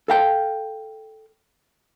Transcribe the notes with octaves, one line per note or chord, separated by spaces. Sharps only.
A4 F5 G5